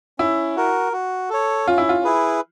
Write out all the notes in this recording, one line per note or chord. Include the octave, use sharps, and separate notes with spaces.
C#4 E4
F#4 A#4
F#4
A4 C#5
C#4 F4
E4
F4
E4 G#4 B4